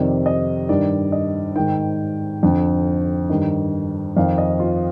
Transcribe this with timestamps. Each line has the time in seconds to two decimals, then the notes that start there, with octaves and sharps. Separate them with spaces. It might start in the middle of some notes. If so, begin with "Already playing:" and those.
Already playing: F2 C3 D#3 D5
0.26 D#5
0.69 G2 D#3 D5
1.12 D#5
1.56 G#2 D#3 G5
2.43 F2 D3
3.29 G2 D#3
4.17 F2 D#3 F5
4.38 D#5
4.60 F4